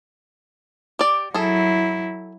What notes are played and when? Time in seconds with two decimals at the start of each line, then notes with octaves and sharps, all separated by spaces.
0.99 G4 D5
1.34 F#3 E4 G#4 A4